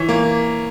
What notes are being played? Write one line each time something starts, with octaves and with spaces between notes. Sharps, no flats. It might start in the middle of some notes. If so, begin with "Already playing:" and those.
Already playing: E3 C#5
A#3